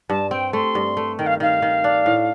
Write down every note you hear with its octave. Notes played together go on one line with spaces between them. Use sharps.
G2 A5
C4 G5
A3 C6
G2
A3
D#3 G5
F5
D#3 F5
D#3
D4
A2